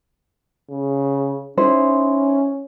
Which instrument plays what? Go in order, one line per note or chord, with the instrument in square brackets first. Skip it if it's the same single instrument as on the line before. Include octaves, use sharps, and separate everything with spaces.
[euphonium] C#3
[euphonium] C#4 [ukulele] D#4 E4 C5